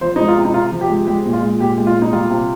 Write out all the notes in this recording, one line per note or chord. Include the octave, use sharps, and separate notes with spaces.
F3 C5
G#3 D#4
F4
C3
D#4
C3 F4
F3
G4
G#3
G#3 G4
A#2
F4
G#3
A#2 G4
G#3
F4
A#2
D#4
G3 F4
C3